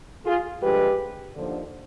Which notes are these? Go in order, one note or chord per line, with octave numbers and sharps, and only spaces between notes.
F4 G#4
G2 D3 F3 G#3 G4 B4
D#2 D3 F3